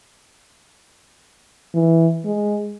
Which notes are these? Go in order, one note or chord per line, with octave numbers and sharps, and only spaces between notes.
E3
G#3